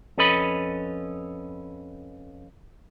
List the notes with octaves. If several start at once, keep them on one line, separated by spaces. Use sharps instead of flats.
F2 C#4 A4 B4 D#5 B5